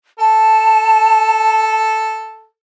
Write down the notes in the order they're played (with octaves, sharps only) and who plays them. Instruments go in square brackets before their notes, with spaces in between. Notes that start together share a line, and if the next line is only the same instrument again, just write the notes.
[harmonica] A4 [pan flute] A5